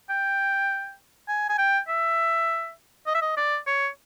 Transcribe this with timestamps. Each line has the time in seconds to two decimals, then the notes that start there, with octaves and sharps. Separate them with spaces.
0.10 G5
1.28 G#5
1.49 G#5
1.58 G5
1.88 E5
3.07 D#5
3.15 E5
3.22 D#5
3.37 D5
3.67 C#5